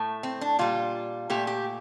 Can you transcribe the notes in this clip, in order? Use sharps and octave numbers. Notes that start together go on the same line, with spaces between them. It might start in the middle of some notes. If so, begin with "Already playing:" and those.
Already playing: A2 A3
C4
D4
A#2 G3 F4
A#2 A3 G4
G4